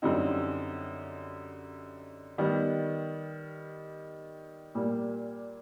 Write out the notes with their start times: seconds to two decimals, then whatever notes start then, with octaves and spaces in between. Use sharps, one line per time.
0.02 F#2 D3 G3 C4 D#4
2.38 D#3 G3 B3
4.75 A#2 G3 A#3